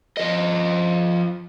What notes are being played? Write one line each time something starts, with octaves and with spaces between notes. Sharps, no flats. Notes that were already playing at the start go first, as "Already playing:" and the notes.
F3 D#5